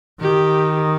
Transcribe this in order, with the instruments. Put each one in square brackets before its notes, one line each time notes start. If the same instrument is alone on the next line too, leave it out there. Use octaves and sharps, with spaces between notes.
[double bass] D#3 [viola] G4